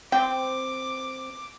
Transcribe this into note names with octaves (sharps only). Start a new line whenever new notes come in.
C4 G5 D6